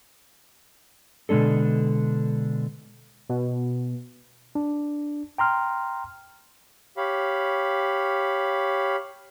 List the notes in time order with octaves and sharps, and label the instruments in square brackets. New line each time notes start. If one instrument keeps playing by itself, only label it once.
[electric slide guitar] B2 D3 G#3 D4 A4
[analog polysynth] B2
[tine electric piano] D4
G5 A#5 C6 F6
[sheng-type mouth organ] G4 C#5 F5 B5